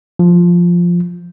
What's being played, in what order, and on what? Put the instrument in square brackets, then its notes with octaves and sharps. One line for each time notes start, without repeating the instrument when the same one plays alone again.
[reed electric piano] F3